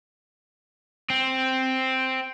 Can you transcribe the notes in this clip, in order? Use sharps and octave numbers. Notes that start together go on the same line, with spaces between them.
C4